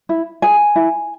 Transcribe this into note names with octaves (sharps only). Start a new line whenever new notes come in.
E4
G#4 G#5
E4